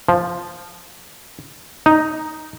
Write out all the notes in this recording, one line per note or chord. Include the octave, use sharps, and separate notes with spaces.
F3
D#4